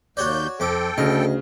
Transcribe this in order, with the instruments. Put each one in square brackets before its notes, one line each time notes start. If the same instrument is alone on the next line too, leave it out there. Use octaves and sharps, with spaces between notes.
[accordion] D#2 G6 [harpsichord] F#4 C#5 D5
[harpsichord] F2 D6 [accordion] A4 G5
[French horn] D2 [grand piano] C#3 [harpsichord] D#5